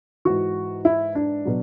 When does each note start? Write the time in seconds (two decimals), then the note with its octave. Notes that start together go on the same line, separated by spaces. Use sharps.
0.25 G#2 E3 F#4
0.85 E4
1.15 D4
1.45 B2 F#3